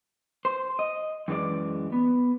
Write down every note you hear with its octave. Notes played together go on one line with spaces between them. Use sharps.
C5
D#5
F#2 E3 G#3 D5
B3